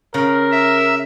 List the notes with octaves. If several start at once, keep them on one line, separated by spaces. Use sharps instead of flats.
C#3 A#4
E5